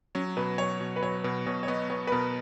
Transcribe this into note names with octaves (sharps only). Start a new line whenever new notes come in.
F#3 C#4
B2 B4
F#3 C#5
B2
B4
F#3 C#5
B2 B4
B2 C#5
C#5
B3 D#5
B3 C#5
B4
B2 A#4